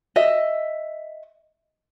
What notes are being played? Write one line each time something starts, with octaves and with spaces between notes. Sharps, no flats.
D#5 E5